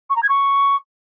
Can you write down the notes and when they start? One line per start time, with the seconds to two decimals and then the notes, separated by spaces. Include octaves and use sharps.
0.10 C#6
0.16 A#5
0.23 G#6
0.29 C#6